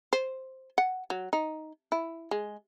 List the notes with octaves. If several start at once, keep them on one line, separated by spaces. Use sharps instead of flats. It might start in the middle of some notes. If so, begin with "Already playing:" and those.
C5
F#5
F#3
D#4
E4
G#3